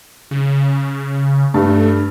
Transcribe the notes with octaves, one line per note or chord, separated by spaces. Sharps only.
C#3
G2 A3